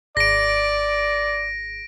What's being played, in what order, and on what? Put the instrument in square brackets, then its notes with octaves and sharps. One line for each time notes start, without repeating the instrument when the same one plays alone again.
[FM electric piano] G#1 [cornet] D5 [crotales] A#6 D7